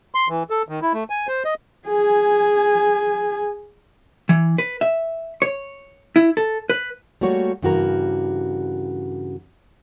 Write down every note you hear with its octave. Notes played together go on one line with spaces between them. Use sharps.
C6
E3
A4
D#3
E4
A3
G#5
C5
D#5
G#4 G#5
E3
B4
E5
C#5
E4
A4
B4
G3 A3 A#3 F#4 C#5
G2 C#3 E3 F#4 G4 A#4